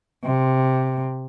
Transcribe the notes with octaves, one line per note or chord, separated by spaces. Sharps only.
C3